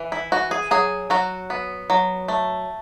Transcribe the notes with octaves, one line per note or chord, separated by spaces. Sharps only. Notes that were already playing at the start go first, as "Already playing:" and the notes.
Already playing: E3
E4
E3 F#4
G#4
F#3 G#4
F#3 F#4
B3
F#3
A3